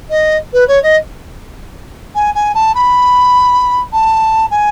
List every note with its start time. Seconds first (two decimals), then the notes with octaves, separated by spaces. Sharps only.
0.09 D#5
0.53 B4
0.68 C#5
0.82 D#5
2.15 G#5
2.34 G#5
2.54 A5
2.75 B5
3.92 A5
4.50 G#5